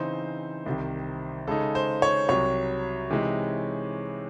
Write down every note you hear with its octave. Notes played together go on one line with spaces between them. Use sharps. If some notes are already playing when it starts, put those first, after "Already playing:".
Already playing: C#3 E3 C4 D#4 C5
C2 C3 D#3
C#3 G#3 D#4 A4
C5
C#5
C2 C3 F#3 C#5
C3 E3 G#3 D#4